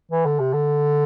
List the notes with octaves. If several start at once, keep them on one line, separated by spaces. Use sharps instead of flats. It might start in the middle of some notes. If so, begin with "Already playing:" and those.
E3
D3
C3
D3